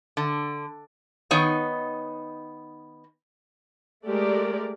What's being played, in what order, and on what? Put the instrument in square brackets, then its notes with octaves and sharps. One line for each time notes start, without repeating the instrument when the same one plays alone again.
[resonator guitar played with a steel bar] D3
D#3 B3 D#4 C#5
[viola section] G#3 A3 G4 A#4 D5